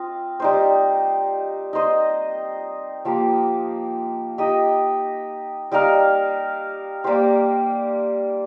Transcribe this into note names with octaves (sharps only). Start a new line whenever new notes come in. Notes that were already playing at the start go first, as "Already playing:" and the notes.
Already playing: C4 F4 D#5
G3 D#4 C5
D#4 C5 D#5
F3 A#3 G4
D#4 G4 D#5
G3 D#4 A#4 F5
G3 A#3 G4 C5